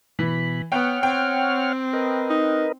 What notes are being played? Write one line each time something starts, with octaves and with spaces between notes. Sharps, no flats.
B2 E3 B5
B3 C#5 F#5 G5 F6
C4 G5
A#4 B4 D#5
D#4